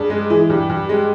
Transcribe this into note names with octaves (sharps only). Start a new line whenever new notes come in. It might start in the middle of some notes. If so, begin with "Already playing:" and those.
Already playing: G2 G#4
G#3
E3
G2 G4
G2
G#3 G4